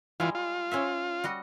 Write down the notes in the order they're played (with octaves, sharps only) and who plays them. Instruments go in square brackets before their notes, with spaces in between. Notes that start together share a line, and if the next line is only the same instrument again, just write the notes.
[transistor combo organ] E3 F4 [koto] G3 G#3
[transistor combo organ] F4
[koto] C#4 C5 E5
G3 F#4 D#5